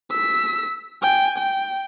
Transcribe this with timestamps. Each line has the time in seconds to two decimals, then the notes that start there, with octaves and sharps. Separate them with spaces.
0.11 E6 B6
1.02 G5 G#5
1.38 G5